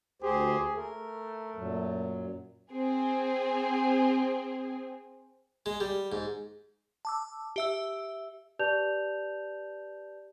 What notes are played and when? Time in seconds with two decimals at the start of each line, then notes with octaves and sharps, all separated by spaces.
0.22 D2 G4 G#4 C5
0.76 A3 A#4
1.56 F#2 A#2 F#3
2.70 C4 G#4
5.66 G#3
5.80 G3
6.12 G#2
7.05 A5 D6 E6
7.56 G4 E5 E6
8.59 G4 B4 D5 A5 G6 F7